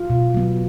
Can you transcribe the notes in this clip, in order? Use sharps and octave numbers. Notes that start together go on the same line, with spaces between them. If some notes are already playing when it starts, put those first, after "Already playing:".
Already playing: F4
B2
F#3 B3